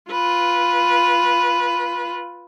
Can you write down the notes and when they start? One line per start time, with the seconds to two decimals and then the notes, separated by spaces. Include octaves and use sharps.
0.11 F4 B4